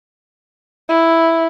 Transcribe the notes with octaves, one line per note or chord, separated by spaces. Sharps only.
E4